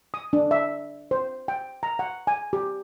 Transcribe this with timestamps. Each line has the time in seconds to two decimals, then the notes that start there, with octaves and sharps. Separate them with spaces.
0.14 D#6
0.33 D4
0.51 E5
1.11 C5
1.48 G5
1.83 A#5
1.99 F#5
2.27 G#5
2.53 G4